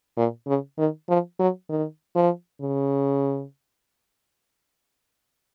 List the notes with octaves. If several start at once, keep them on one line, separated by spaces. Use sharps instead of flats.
A#2
C#3
D#3
F3
F#3
D#3
F3
C#3